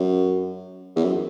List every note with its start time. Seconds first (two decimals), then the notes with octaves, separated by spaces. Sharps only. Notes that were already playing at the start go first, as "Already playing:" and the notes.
Already playing: F#2
0.96 E2
1.04 F#2